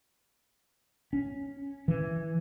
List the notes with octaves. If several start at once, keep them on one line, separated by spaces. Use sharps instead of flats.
C#4
E3